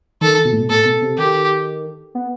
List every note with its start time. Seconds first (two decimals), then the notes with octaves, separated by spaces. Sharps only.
0.21 D#3 A4
0.45 B2
0.53 A2
0.60 B2
0.69 A2 A4
0.85 B2
1.02 C3
1.17 D#3 G4
2.15 B3